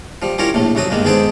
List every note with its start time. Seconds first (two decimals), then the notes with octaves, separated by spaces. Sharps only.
0.22 F3 G3
0.38 G3 C#4 E4 F4 A#4 C#5
0.54 A#1 A2 A3
0.75 C2 F#2 F#3 F#4 A4 D#6
0.90 G2 G#3 A#3 B3
1.05 G#2 B3 G#4 A4 C5 D5